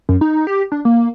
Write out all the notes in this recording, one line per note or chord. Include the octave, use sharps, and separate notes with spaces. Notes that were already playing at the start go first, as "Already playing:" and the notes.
F#2
D#4
G4
D4
A#3